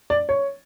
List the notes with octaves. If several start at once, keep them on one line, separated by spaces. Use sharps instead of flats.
D5
C#5